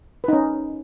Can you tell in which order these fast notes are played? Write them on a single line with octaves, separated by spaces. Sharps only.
B4 D#4 C#4